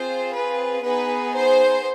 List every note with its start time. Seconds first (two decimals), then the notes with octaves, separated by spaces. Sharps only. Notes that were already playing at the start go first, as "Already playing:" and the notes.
Already playing: C4 F4 G#4 C5
0.35 B4
0.84 B3 D#4 G#4 B4
1.34 C5